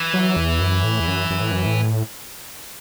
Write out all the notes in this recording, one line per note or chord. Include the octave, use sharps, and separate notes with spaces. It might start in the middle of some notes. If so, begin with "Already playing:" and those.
Already playing: E3
F#3
E2
F#2
A2
E2
F#2
F#2
A2
F#2
A2